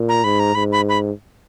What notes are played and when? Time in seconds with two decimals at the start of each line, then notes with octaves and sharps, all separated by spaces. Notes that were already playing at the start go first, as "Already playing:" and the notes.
Already playing: A#2
0.09 A#5
0.24 G#2 B5
0.40 A#5
0.55 G#2 B5
0.72 B5
0.89 B5